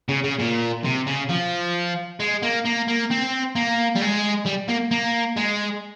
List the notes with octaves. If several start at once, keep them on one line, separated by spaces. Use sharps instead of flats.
C#3
C#3
A#2
C3
C#3
F3
G#3
A#3
A#3
A#3
C4
A#3
G3
G#3
G3
A#3
A#3
G#3